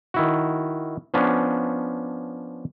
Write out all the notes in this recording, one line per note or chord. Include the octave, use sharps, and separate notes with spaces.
D#3 E4 F#4
F3 B3 C#4 D4